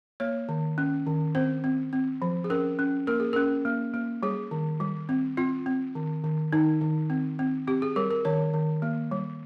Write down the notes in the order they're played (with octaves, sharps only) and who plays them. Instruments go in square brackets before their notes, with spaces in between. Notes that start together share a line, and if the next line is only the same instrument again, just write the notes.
[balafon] A#3 C#5
D#3
C#4
D#3
C4 C5
C4
C4
F3
G#4
C#4 A#4
C#4
A#3 A#4
G#4
C#4 A#4
A#3
A#3
G3 G#4
D#3
G3
C4
C4 F4
C4
D#3
D#3
D#3 D#4
D#3
C4
C4
C4 G4
G#4
G3 A#4
A#4
D#3 C#5
D#3
A#3
G3